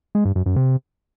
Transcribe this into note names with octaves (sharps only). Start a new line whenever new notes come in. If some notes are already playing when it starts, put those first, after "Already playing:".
G#3
G2
F#2
F#2
C3